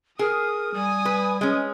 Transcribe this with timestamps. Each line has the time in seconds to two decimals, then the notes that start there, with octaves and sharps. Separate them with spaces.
0.19 G#4 A#4 D#6
0.74 G3 G#5 D#6
1.05 B4
1.41 G#3 C#4